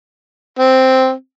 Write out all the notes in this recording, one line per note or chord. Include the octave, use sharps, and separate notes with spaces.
C4